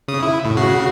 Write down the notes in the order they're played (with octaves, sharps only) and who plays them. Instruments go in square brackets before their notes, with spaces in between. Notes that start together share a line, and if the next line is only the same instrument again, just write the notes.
[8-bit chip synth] C#3 D#6
E4
A2
C#3 F#4 C7